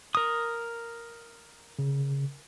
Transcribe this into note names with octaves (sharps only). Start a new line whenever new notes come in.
A#4 D#6
C#3